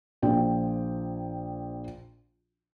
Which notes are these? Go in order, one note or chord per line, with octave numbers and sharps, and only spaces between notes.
A#1 F3 G5